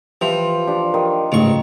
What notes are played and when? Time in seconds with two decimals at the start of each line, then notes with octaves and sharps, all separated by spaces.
0.21 E3 F3 G4
0.67 D4 G4
0.94 D#3 A#4
1.32 A1 G#2 C#3 C#6